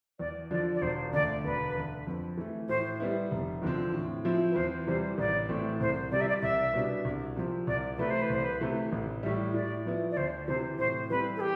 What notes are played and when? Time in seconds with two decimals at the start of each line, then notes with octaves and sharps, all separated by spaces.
0.19 E2 D5
0.51 D3 F3 D5
0.75 D5
0.82 E1 C5
1.13 D2 D3 A3 D5
1.44 E1 B4
1.75 D2 D3
2.07 F2
2.37 E3 A3
2.69 A2 C5
3.00 G3 B3 E4
3.31 F1
3.62 E2 D3 F3 C4
3.94 A2
4.25 F3 C4 E4
4.51 B4
4.56 E2 C5
4.87 C3 E3 G3 C5
5.18 A1 D5
5.49 A2 E3 A3 C4
5.80 C2 C5
6.12 C3 E3 G3 D5
6.21 E5
6.29 D5
6.42 C2 E5
6.73 B2 G3 B3 D4
7.05 C2
7.36 C3 F3 C4
7.67 C2 D5
7.98 C3 E3 A3 B4
8.10 C5
8.22 B4
8.30 C2 C5
8.44 B4
8.61 C3 E3 A3
8.92 A1
9.23 A2 G3 E5
9.54 A2 D5
9.85 F3 B3 E4
10.11 D5
10.16 D2 C5
10.47 C3 E3 C5
10.79 A2 C5
11.10 E3 G3 C4 B4
11.37 A4
11.41 G4